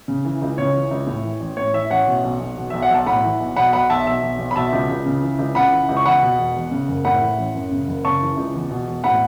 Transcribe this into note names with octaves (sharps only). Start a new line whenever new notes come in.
C#3
E3
C#2
C#3 C#5
E3
C#2
A2
E3
A1
A2 C#5
E3 E5
A1 C#5 F#5
B2
B1
B1
B2
B1 E5
F#5
B1 A5
A2 F#5 B5
E3
B1
B2 F#5 B5
B1 F#5 B5
B1 E5 A5
B2 E5
B1
B1
B5
B2 E5 A5
C#2
C#2
C#3
E3
C#2
C#3 F#5 B5
E3
C#2
C#6
E2 F#5 B5
B2
E1
E2
C#3
F#1
A2 F#5 B5
E3
A1
F#2
C#3
F#1
C#3 A5 C#6
E3
C#2
E2
B2
E1
A2 F#5 B5